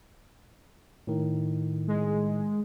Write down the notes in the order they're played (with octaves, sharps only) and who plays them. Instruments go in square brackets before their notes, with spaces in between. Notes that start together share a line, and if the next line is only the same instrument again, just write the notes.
[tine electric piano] A2 D#3
[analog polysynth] G#3